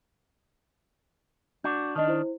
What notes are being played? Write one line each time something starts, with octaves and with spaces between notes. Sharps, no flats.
D4 F#4 D6 G6
D#3 D4 D#5 A5
E4 C5